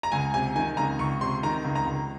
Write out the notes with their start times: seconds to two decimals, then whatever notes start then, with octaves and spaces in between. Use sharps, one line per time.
0.03 A#5
0.12 C#2 G#5
0.34 C3 G#5
0.56 D#3 G#5
0.77 C#2 A#5
0.99 C#2 C#6
1.21 C3 C6
1.43 D#3 A#5
1.64 C#2
1.75 A#5
1.87 C#2